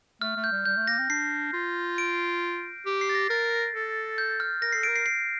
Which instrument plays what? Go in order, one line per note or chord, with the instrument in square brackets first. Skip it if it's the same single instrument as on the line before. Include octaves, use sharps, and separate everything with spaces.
[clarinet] A3 [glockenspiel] F6
[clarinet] A3
[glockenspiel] G6
[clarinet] G3
[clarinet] G3 [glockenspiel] G6
[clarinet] A3
[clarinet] A#3 [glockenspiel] A#6
[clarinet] C4
[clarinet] D4 [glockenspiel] C7
[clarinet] F4
[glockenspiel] D7
[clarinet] G4
[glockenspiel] C7
A6
A#6
[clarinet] A#4 [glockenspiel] A6
[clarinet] A4
[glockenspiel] G6
F6
[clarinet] A#4 [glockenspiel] A#6
[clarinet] A4 [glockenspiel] C7
[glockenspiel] D7
[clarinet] A#4
[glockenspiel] C7
C7